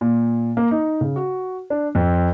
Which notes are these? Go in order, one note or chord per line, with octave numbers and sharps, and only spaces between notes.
A#2
A#3
D#4
C#3
F#4
D4
F2